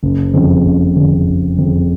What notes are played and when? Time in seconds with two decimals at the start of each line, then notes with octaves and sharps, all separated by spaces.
0.03 F#1
0.34 F2 C#3
0.65 F#1
0.96 F2 C#3
1.27 F#1
1.58 F2 C#3